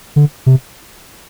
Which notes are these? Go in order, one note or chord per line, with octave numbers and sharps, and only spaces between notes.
D3
C3